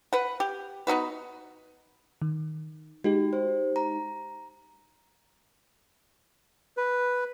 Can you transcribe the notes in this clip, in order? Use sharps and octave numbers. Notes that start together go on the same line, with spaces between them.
B4 F#5
G4
B3 D#4 F#4 B4
D#3
G#3 D#4 F#4 G4
C5
A#5
B4